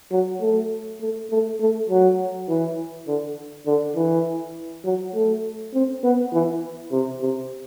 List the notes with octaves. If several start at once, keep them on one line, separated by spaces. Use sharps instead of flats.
F#3
A3
A3
A3
A3
F#3
E3
D3
D3
E3
F#3
A3
C4
B3
E3
C3
C3